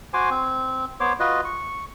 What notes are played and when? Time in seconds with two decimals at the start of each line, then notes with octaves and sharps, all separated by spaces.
0.14 F#4 C5 G#5 D6
0.31 C4
1.00 B3 C5 C#5 D6
1.20 F4 F#4 B4 D#5
1.45 C#6